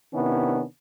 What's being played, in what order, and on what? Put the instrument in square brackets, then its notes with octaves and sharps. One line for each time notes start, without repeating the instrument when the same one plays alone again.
[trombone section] C3 D#3 B3 C#4 D4 E4